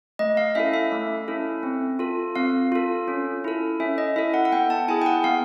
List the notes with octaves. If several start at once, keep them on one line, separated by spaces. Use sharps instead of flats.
A3 D#5
F5
C#4 E4 A4 E5
E5
A3
C#4 E4 A4
C4
F4 A4
C4 F5
F4 A4
C#4
E4 A4
C#4 E5
D#5
E4 A4 E5
F#5
F#5
B3 G5
A5
E4 G#4 G#5
G5
F#5
B3 F5